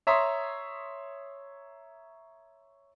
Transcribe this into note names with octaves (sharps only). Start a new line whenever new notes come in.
C#5 E5 A#5 C6 D#6